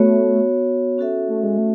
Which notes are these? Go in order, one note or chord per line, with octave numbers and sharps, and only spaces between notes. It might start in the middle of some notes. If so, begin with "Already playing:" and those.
Already playing: A3 B3 F#4 C#5
C#4 F#4 A4 E5
A3
G#3
A3